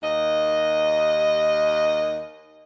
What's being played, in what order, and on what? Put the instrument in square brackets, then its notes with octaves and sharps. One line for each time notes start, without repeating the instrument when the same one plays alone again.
[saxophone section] D#2 D#5